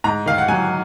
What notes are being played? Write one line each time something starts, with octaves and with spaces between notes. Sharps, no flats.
G#2 A#5
D#3 F5
F#5
F#3 G#5